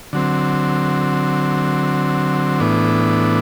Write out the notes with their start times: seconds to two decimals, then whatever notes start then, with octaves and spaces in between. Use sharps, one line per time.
0.13 D3 F#3 C4
2.60 A2 E3 B3 D4